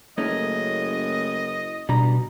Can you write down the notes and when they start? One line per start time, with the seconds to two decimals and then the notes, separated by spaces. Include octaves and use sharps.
0.18 F#1 A3 A#3 C#4 D#5
1.89 B2 G3 D4 A#5